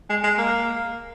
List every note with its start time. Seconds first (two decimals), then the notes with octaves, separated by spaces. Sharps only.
0.10 G#3
0.24 G#3
0.38 A#3